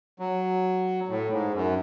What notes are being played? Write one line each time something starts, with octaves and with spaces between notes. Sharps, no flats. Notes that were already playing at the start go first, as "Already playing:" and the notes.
F#3
A2
G#2
F#2